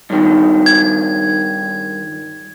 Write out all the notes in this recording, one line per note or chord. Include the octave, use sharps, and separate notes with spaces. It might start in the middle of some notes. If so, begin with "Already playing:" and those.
G2 D#3
G#6